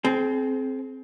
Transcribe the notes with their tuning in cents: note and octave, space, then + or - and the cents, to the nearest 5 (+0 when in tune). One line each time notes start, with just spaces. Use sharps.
C4 +0 G#4 +45